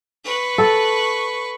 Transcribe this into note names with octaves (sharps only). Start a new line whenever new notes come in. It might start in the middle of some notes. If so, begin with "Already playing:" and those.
B4 C#6
A4